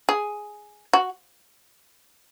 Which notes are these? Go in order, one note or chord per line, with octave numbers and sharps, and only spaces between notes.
G#4
F#4